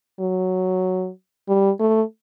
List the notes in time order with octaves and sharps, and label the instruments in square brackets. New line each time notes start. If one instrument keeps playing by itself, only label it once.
[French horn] F#3
G3
A3